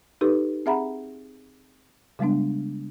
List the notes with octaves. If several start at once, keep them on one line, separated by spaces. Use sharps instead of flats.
D#4 G4 A4 B4
C4 G#4 E5 F#5 A#5 B5
C#3 G3 G#3 B3 D4